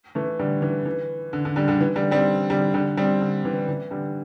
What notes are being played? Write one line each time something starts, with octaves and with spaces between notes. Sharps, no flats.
E3 A3
D3 G3
E3
E3
D3
D3
D3 G3
D3 G3
E3
D3 G3
G3 C4
D3 G3
D3 G3
G3 C4
D3
E3
E3
D3 G3